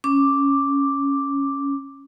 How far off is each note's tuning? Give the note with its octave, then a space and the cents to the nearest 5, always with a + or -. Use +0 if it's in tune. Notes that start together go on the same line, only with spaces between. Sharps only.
C#4 +0 D6 +0